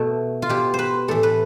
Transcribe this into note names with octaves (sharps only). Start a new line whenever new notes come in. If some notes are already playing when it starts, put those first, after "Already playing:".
Already playing: B2 A3
F4
B2 G4
C5
B4
A2 E3 A4
B4